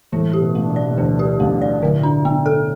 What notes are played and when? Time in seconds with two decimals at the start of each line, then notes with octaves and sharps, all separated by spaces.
0.12 A2 E3 A3
0.33 G4
0.41 B2 B3
0.55 A3
0.62 D4
0.69 B2 B3
0.76 D5
0.90 B2
0.97 D2 D3 E3
1.19 G4
1.40 B1 B2 A3
1.62 D5
1.82 A2 D3
2.03 D4
2.25 B3
2.46 A4